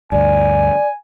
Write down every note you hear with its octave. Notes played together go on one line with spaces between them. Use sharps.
D2 G2 D5 G#5